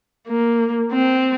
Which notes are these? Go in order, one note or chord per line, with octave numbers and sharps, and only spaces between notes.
A#3
C4